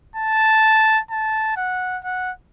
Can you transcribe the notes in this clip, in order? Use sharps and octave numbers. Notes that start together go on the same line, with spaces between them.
A5
A5
F#5
F#5